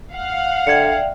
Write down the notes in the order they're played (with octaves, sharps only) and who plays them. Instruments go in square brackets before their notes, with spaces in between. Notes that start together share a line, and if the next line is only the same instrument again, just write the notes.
[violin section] F5 F#5
[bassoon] D3 [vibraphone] D5 E5 G5 [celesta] G#6 C#7